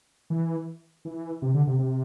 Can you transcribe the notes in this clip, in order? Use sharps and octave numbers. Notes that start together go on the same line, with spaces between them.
E3
E3
C3
D3
C3
C3